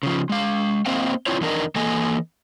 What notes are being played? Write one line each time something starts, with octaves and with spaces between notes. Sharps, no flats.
C#3 F3
G#3 F5
A#3 C4 C5 D#5 F5 G5
C4 D4 E4 F4 C5 C#5
E2 D#3 D4 A#4 D#5
E3 A#3 A4 D#5 G#5